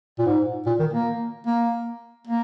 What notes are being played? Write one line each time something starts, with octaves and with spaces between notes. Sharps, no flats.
A#2
G#2
A#2
D#3
A#3
A#3
A#3